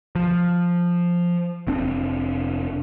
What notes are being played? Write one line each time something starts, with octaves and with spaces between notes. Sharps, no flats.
F3
F1 C4 D4